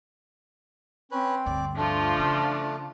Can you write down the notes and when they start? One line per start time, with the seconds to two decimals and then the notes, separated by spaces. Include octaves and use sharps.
1.11 C4 C#4 B4
1.46 D2 G2 D5
1.76 F3 A3 D4 F4
2.19 C#3